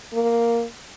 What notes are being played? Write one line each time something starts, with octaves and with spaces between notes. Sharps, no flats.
A#3